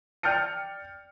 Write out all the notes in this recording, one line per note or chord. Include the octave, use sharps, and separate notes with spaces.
D5 G5 F6 G6 A6 C#7